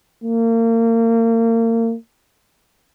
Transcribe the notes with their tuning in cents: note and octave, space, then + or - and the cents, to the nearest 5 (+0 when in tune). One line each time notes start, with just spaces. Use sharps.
A#3 -35